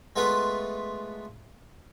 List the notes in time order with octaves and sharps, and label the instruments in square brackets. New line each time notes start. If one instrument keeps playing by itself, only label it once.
[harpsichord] G#3 A3 B3 F4 B4